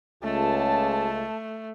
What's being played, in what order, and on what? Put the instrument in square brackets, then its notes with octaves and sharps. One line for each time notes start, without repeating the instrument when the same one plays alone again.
[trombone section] C#2 [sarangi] A3 [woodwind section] A5